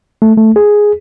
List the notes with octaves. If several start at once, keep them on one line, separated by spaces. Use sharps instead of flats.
A3
A3
G#4